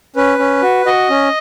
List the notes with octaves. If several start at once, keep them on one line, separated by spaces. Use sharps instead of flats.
C#4 B4
C#4
F#4
F#4 D#5
C#4